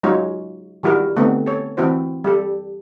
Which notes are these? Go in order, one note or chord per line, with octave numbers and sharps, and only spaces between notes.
F#3 G#3 D#4 F4 C#5
D#3 G3 E4 F#4 A#4
D3 A3 B3 C4 D#4
A4 C#5
E3 C4 E4 F#4 C5
G3 G4 A4